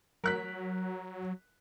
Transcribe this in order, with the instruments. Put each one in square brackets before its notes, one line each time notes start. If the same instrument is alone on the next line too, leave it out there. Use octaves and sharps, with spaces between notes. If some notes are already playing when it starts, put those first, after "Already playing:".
[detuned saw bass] F#3 [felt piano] A#4 F#6 B6